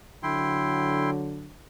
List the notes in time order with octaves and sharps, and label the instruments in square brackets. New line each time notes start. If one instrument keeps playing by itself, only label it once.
[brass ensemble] D3 F#3 [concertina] E4 G5 C6